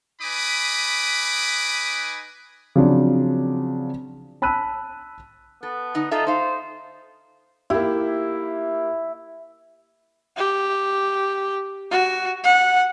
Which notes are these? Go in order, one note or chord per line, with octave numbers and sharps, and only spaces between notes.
D#4 B4 G#5 B5 D6 D#6
C#3 F3 F#3 C4 D4
A5 B5 E6 F#6 D#7
B3 A4
D3 D#4
D#4 F4 A4 E5
D#4 C5 F5
A#3 E4 G4
G4
F#4
F#5